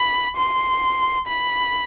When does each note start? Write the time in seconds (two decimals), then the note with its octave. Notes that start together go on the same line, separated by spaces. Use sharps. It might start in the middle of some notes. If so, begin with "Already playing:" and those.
Already playing: B5
0.37 C6
1.28 B5